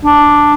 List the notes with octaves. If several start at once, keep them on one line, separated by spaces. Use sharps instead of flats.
D4